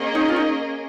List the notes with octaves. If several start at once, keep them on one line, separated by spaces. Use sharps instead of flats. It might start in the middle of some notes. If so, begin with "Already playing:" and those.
Already playing: A#3 C#4 G#4 D#5
D#4
F4
D#4